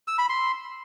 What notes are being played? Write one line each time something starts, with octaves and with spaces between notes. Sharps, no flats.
E6
B5
C6